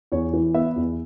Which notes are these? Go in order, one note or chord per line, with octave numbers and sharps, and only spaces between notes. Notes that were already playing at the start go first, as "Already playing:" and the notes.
E2 C#5
E3
B3 E5
E2